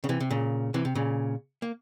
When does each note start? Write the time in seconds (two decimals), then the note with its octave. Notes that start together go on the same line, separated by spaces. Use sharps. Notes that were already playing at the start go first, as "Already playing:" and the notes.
0.04 C#3
0.09 C3 E3
0.20 C3
0.30 A#2 C#3
0.74 C3 E3
0.85 C3
0.95 A#2 C#3
1.62 A#3